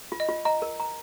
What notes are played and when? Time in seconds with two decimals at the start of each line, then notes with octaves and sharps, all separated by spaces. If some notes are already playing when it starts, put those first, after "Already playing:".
0.12 F4
0.20 D#5
0.29 F4
0.45 D#5 A#5
0.62 A#4
0.80 A#5